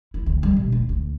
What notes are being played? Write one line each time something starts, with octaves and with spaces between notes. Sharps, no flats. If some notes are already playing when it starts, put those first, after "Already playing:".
E4
D2
G3
B2
D2
D2